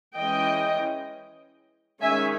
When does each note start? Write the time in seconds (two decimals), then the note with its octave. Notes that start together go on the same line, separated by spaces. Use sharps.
0.18 E3 G#3 C#4 D#5 G5
2.02 D#3 G#3 C#4 E5 G#5